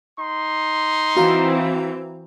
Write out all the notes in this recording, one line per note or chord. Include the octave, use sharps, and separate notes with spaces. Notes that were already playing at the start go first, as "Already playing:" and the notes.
D#4 C6
E3 C4 F#4 F5 A#5